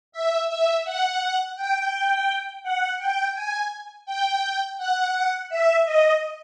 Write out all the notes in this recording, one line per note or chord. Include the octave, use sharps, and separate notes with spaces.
E5
E5
F#5
G5
F#5
G5
G#5
G5
F#5
E5
D#5